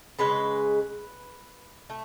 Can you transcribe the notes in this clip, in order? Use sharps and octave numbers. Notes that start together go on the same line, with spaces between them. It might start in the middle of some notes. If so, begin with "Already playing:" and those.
C#3 G#3 B4
A3